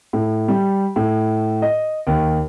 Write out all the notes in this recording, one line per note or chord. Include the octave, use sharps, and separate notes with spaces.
A2
G3
A2
D#5
D#2